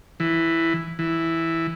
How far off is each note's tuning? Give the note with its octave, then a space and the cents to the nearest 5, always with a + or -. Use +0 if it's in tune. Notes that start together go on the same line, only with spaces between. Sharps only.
E3 +5
E3 +0